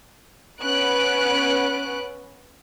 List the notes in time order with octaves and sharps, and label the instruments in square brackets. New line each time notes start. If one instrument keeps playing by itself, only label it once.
[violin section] B3 C#4 B4 F#6 D7